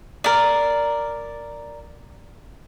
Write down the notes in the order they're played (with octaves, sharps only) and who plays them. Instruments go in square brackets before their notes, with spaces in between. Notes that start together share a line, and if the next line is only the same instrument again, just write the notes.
[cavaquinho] A#4 D5